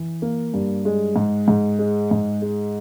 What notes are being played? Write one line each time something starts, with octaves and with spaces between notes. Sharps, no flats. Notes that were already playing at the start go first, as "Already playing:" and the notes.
Already playing: E3
A#3
G2
G#3
G#2
G#2
G#3
G#2
G#3